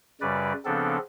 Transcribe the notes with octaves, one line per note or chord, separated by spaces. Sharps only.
F#2 C#3 G3 B4 D5
C#3 F3 B3 C4 D4 A4